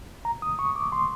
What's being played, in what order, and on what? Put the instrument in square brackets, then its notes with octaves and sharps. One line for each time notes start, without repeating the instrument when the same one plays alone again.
[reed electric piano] A#5
D#6
C#6
D6
C6